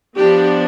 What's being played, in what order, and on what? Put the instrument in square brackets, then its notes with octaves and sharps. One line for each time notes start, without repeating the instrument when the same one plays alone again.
[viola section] F3 B3 D4 G4